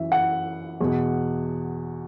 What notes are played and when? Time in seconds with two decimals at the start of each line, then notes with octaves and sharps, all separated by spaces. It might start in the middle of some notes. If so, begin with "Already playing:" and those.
Already playing: F#2 E3 E5
0.12 F#5
0.81 E2 B2